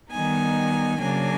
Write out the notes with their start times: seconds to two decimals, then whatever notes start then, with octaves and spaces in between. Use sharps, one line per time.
0.12 D#3 G3 B3 D#4 G#5
1.01 C#3 F#3 A#3 D4 G#5